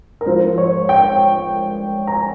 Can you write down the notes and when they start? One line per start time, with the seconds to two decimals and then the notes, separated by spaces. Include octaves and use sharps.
0.21 A#4
0.26 G#2 F3 C5
0.58 C#5
0.89 G5
2.07 A#5
2.12 G#5